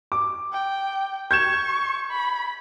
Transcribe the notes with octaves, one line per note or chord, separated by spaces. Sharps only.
D6
G5
C#6 G6 G#6 E7
B5